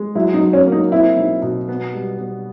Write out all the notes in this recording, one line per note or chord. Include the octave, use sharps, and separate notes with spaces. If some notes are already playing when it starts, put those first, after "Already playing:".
Already playing: G#3
F#3 E4
D#4
F#3
C#4
A#3
D#4
C4 E4
B1
B2
B3
G3
B3